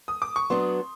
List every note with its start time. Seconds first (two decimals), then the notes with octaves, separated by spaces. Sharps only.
0.08 D#6
0.22 D6
0.36 C#6
0.50 F#3 B3 D4 F#4 C6